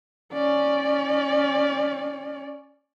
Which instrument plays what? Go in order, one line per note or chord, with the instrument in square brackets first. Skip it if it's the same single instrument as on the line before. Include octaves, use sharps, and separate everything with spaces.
[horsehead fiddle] C#4 D5